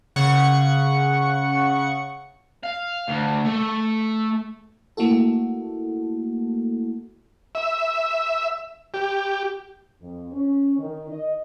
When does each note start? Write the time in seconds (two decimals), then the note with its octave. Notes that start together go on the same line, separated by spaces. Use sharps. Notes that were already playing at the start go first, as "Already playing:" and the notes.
0.16 C#3 F#5 C#6 C#7
2.63 F5
3.08 D2
3.45 A3
4.97 A3 A#3 E4 F#4 A4
7.55 E5
8.94 G4
10.01 F2
10.33 C#4
10.78 D#3
11.09 D#5